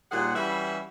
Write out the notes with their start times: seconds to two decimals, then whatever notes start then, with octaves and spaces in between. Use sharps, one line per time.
0.12 D#2 A#2 G3 G#4 F#5
0.35 E3 G3 C#4 E4 F#4 E5